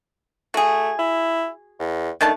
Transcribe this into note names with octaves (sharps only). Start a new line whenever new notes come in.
A3 F#4 G#4
E4
E2
D#3 A3 D4 A5